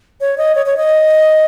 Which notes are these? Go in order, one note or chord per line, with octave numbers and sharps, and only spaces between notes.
C#5
D#5
C#5
C#5
D#5